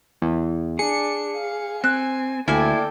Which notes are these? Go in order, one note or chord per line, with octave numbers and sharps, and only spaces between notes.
E2
D4 G#4 C#7
F5
C4 G#5 F#6
D2 A#3 E4 A4 D5 G5 G#5